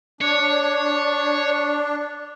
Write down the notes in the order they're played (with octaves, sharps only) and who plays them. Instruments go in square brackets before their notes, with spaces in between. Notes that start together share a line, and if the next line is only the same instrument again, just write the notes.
[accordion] D4 [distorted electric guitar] C#5